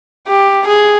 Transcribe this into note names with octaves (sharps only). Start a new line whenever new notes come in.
G4
G#4